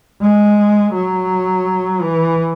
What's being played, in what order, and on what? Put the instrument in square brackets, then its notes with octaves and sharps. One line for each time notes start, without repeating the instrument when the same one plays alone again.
[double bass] G#3
F#3
E3